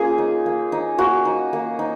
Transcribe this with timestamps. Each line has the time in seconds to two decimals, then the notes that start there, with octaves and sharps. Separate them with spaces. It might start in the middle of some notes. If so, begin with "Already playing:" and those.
Already playing: A#3 C#4 F4 G#4
0.18 D#4
0.46 A#3
0.72 D#4
0.98 A#3 F#4
1.25 D#4
1.53 A#3
1.79 D#4